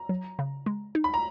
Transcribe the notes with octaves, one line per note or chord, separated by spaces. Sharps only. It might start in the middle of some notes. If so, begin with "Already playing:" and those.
Already playing: A#5
F#3
C#3
G#3
D#4
B5
A#5